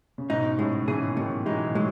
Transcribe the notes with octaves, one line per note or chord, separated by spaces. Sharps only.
C#3
G#2 B2 D#4
A2 C#3 G#3
C#3 E3 G#4
E3
B2 D#3 F#3
E3 G#3 D#4
F#3 G#3 A3